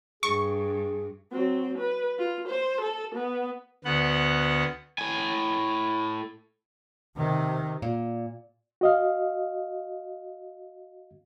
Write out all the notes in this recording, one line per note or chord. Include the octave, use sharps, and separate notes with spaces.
G2 G#4 C#6
F#3 C4
B4
F4
C5
A4
B3
D2 B3 F#5
A2 G#5
C3 D#3
A#2
F#4 D#5 F5